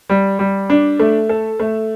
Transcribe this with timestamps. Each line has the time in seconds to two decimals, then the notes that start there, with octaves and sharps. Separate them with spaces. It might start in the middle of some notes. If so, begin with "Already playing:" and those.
0.09 G3
0.39 G3
0.70 D4
0.99 A3
1.29 A4
1.60 A3